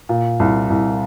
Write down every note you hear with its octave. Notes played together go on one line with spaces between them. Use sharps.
A#2
C2
C2